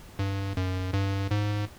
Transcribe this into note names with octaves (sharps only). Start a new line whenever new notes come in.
G2
F#2
G2
G#2